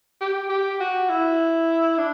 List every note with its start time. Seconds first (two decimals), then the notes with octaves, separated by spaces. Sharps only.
0.21 G4
0.49 G4
0.80 F#4
1.09 E4
1.98 D4